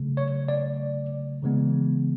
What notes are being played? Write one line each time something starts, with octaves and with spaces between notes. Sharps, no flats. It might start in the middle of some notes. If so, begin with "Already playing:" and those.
Already playing: C#3 F#3 A3
C#5
D5
C#3 E3 G#3 B3